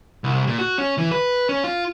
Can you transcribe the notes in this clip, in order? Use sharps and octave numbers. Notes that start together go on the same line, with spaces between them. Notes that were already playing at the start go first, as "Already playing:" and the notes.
C2
A#2
F#4
C#4
E3
B4
C#4
F4